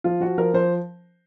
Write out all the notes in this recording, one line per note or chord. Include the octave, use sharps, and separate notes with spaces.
F3 F4
F3 F#4
F3 A#4
F3 C5